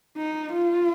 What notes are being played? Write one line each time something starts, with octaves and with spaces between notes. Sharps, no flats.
D#4
F4